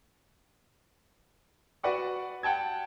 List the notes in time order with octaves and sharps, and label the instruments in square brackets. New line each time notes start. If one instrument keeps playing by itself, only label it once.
[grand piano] F#4 B4 D5 F#5 C#6
F#5 G5 A5 G#6